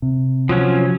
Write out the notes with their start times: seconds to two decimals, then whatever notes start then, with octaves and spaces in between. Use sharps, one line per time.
0.02 C3
0.49 F3 F#3 C#4